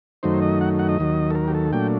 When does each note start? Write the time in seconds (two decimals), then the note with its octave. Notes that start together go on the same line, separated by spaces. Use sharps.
0.23 F#2 D#3 F#3 A3 D#4 C5
0.42 D#5
0.61 F#5
0.79 F#5
0.89 D#5
0.99 D#2 D#3 F#3
1.30 A4
1.35 A#4
1.48 G4
1.54 A4
1.73 A#2 F#3 A3 D4 G5